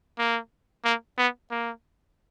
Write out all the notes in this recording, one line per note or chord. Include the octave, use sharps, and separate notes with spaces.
A#3
A#3
B3
A#3